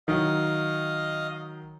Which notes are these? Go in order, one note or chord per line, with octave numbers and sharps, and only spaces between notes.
D#3 F#3 D#5 F5